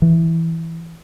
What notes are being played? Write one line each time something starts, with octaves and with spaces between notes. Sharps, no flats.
E3